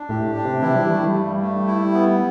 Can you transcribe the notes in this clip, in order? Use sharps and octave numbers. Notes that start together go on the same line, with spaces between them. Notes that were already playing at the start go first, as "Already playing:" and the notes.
Already playing: D4
A2 G4
D4
C3
E3 E4
G3
E3 A3
G3
G2
A3
E4
B3